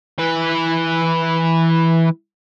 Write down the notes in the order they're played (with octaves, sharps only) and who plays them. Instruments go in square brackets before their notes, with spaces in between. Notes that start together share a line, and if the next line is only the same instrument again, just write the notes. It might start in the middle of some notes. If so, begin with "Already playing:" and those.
[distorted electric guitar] E3 B4